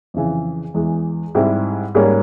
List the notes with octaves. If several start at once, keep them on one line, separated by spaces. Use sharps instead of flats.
F2 C#3 E3
E2 E3 G#3
G#2 G3 C4 E4 G4
G#2 G3 A#3 C#4